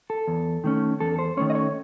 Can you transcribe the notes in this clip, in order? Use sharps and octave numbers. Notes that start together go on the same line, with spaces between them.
A4
E2
D#3 A3 C#4
E2 A4
C5
D#3 A3 C#4 C#5
D#5
C#5